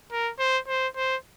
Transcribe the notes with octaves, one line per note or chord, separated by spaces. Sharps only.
A#4
C5
C5
C5